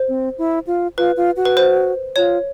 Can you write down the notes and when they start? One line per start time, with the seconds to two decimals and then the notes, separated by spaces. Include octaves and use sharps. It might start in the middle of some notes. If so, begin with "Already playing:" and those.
Already playing: C5
0.08 C4
0.38 E4
0.67 F4
0.98 F4 B4
1.17 F4
1.37 F#4
1.45 B4
1.57 C5
2.16 F4 C#5